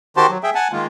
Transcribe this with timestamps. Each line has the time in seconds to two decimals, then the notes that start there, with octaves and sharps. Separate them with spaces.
0.17 D#3 F#4 G4 C5 A5 C6
0.30 F#3
0.43 G#4 E5 G5
0.55 F#5 G#5 A5
0.73 D#3 G#3 A#3 F4